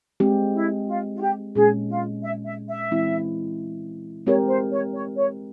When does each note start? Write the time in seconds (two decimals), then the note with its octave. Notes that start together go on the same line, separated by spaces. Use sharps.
0.20 G#3 C4 G4
0.54 E4
0.88 F4
1.16 F4
1.21 G4
1.55 A#2 G#3 C#4 G#4
1.89 F4
2.23 E5
2.46 E5
2.69 E5
2.91 E3 G#3 C4 E4
4.26 G#3 C4 G4 A#4 C#5
4.49 C5
4.72 C#5
4.94 C#5
5.17 C#5